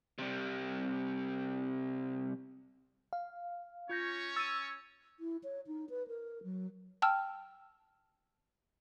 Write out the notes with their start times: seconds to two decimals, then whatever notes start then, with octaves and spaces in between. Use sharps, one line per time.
0.19 C3 G3
3.13 F5
3.89 C#4 F4 C#5 G6 A#6
4.36 E6 A6 D#7
5.20 E4
5.44 C#5
5.67 D#4
5.90 B4
6.08 A#4
6.44 F#3
7.02 G5 A5 E6 F6